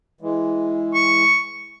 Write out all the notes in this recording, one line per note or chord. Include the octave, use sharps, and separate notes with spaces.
E3 G#3
C#6